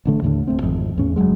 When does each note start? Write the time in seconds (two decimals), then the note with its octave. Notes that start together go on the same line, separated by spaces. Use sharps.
0.05 A1 D3 A3
0.22 D#2 A2 D3
0.47 D1 A3 C4
0.62 G#1 F2
0.98 E2 A2 C#4
1.16 F#1 D#2 F#3 G#3